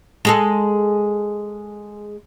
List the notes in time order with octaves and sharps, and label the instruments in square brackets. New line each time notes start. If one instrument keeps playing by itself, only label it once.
[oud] G#3 G#4 A4